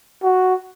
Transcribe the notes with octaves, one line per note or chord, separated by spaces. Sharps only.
F#4